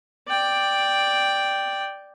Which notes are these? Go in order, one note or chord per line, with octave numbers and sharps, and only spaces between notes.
D5 G5